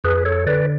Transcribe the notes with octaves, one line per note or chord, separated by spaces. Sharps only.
F2 G#4 B4
A4 C#5
D3 B4 D5